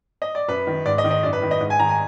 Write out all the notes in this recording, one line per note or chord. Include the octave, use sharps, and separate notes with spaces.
D#5
D5
F#2 B4
D#3
G#2 D5
D#5
D#3
D#5
F#2 D5
B4
D#3
D#5
G#2
G#5
D#3 A#5
G#5